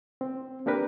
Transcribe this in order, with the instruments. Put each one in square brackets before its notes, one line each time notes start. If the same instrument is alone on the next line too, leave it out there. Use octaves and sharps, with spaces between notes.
[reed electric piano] C4
A#3 D4 G4 A#4 B4